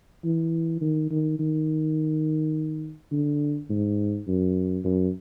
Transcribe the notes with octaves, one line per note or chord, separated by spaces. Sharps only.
E3
D#3
D#3
D#3
D3
G#2
F#2
F#2